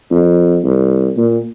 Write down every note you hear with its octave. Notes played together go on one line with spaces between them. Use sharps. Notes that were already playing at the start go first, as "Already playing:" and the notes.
F2
C2
A#2